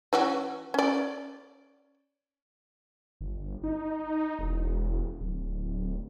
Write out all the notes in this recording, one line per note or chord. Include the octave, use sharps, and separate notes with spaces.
E3 C#4 F#4
C#4 D5
G1
D#4
E1
D1